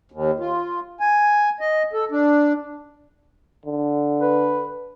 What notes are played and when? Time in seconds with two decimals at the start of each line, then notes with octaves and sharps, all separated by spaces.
0.11 D#2
0.40 F4
1.00 G#5
1.60 D#5
1.93 A4
2.11 D4
3.66 D3
4.22 B4